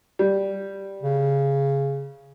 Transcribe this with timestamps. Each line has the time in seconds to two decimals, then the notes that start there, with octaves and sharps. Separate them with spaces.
0.19 G3
1.02 C#3